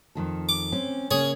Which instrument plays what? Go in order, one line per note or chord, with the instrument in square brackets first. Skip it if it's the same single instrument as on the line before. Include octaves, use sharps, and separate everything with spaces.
[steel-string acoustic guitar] F2 D#3 A4
[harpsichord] D6
[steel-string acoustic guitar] C4 C#4
[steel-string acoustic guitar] C#3 A#3 [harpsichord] G#4 C#5